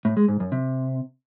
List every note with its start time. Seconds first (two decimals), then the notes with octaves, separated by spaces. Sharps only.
0.05 A2
0.17 G#3
0.28 G#2
0.40 F#2
0.52 C3